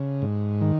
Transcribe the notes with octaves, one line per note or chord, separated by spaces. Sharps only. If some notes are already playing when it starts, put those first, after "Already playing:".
Already playing: C#3
G#2
D#3